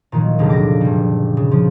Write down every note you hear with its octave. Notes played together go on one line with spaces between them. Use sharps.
A#2 D#3 F#3
F1 C#2 D3
D6 A#6 D7
F#1 G3
C#3
F3